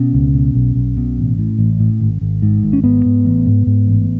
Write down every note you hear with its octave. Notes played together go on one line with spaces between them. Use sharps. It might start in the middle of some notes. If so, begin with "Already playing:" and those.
Already playing: B2 C#4
C#2
B2
B1
B1
B2
A1
A2
A1
A2
G#1
G#1
G#2
G#1
C#4
G#2 B3
G#2
A1
G#2
G#2
A1